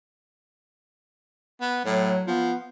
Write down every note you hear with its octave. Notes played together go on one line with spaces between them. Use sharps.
B3
A2 F#3
F3 B3